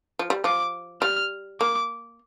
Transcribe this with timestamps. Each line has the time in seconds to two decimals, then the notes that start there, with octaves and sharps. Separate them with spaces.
0.19 F3
0.30 G3
0.44 F3 D6
1.02 G3 F6
1.60 A#3 D6